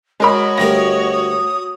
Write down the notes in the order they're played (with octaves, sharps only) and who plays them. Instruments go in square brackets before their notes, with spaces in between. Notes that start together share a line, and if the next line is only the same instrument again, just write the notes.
[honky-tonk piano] G#3 A#4 B5 [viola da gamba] F#4 C#5 [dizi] D#5
[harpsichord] D2 G3 A#4 [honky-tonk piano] A#6
[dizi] D#6